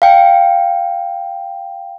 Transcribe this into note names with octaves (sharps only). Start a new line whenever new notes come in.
F5 G5